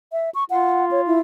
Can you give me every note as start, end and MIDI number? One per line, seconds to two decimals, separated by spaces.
0.12 0.30 76
0.35 0.44 85
0.50 1.21 65
0.50 0.85 78
0.91 1.01 73
1.07 1.20 64